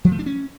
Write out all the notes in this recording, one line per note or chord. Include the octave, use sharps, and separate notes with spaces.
F3
A3
D4
C#4